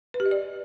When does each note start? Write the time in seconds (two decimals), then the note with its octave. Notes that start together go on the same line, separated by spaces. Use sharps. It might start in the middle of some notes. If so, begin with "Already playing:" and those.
0.14 B4
0.20 G4
0.26 D#5
0.31 D5